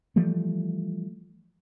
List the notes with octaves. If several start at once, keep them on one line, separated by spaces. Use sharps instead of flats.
E3 F3 G3 A3